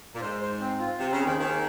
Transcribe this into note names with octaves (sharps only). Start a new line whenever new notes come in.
A#2
G#2 C5
C5
C4
F4
C3 C4
C#3
G#4
D#2 D#3
D#2 D#3 G#4